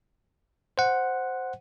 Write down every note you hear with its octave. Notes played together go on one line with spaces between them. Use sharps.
C5 F#5